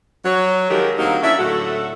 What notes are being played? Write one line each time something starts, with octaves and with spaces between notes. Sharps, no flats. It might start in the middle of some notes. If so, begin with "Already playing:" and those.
F#3 C#5
D#3 F3 F#3 G#3 G4 A#4
D2 F#3 A#3 C4 D#4 F#4
C#4 D4 E4 E5
A2 D3 F#3 A3 F#4 A4